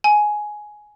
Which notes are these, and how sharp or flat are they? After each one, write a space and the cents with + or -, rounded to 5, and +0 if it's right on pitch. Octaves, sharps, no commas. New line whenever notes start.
G#5 +10